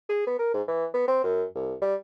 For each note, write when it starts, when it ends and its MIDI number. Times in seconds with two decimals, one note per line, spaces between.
0.09 0.23 68
0.27 0.38 59
0.39 0.52 70
0.54 0.62 44
0.67 0.85 52
0.94 1.06 59
1.08 1.21 60
1.24 1.44 42
1.55 1.73 36
1.81 1.95 55